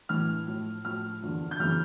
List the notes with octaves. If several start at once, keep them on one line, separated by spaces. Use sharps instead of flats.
A2 E3 F6
A2 F3
A2 F3 F6
E2 D3 F3
G6
E2 C#3 E3 F6